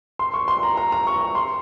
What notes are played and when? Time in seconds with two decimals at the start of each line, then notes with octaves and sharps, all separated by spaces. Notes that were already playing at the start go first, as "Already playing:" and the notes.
0.19 C6
0.34 C#6
0.48 C6
0.63 A#5
0.77 A#5
0.92 A#5
1.07 C#6
1.21 C#6
1.35 C6